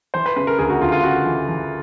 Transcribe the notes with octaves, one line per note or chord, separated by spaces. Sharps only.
E3 C5
B4
C#3 B4
A#4
D2 G#4
F#4
D2 F4
F4
C#3 F#4
E3
E3